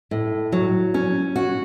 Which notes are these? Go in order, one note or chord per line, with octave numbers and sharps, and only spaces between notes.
A2
F#3
C#4
F#4